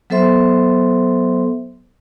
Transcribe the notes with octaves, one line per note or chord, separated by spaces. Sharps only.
F#3 B3 A4 C5 E5 C6